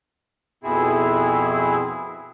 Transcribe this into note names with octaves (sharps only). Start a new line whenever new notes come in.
F2 B2 C4 E4 G#4